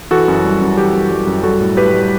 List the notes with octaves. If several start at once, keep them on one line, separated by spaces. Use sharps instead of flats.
E3 F#4 A4
F#2
G3
F#2
E3 G4
F#2
G3
F#2
G3 F#4 A4
A2
A2 G4 B4
G3